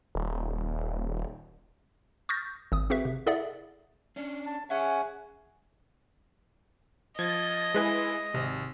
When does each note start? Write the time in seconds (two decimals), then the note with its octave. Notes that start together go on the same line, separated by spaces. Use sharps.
0.15 D#1
2.29 C#6 D#6 F6 G6 A6 A#6
2.72 G#1 D#6
2.90 C4 F#4 G#4 B4 E5
3.05 C3
3.26 E4 G#4 A4 D5 E5 F#5
4.16 C#4 D4
4.46 A5
4.70 C#4 G#4 E5 F#5 G#5
7.19 F3 D#5 G#6 A6
7.74 G#3 E4 G#4 B4 G#5
8.34 G#1 C3